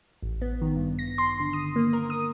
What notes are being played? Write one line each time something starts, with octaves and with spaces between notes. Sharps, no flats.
A1
B3
D#3
G2
A#6
C6
D3
D#6
A#3
A#4
D#6